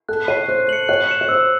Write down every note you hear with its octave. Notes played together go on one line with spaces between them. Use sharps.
A4 F#6
C#5 C7 D#7
C5 F#6
C5 C#7 F#7
C#5 F#6
C#7 E7
C#5
C5 E6